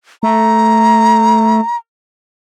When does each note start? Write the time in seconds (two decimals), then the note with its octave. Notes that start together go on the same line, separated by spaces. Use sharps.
0.23 A3 A#5